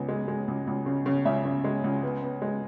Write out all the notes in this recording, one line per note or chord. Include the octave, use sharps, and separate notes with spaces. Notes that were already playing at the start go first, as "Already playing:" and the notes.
Already playing: C#2 B3
G#3
G#3
C#2
C#2
C#3
C#3
C#2 E5
C#3
G#3
C#2
B3
B3
G#3